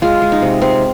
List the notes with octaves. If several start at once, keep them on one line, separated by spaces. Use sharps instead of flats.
G#3 F4
G#3
D#4
C3
C3 C4